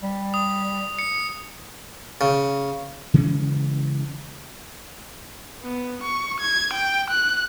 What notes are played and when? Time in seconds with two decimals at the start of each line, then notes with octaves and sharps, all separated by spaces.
0.03 G3
0.34 D#6
0.99 C#7
2.21 C#3
3.14 C#3 E3 G#3 C#4
5.63 B3
6.03 C#6
6.41 G#6
6.74 G5
7.10 F#6